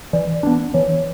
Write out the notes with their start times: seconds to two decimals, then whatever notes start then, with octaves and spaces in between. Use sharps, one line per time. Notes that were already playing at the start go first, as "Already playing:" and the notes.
0.13 E3 D5
0.43 B3 D4
0.74 E3 C#5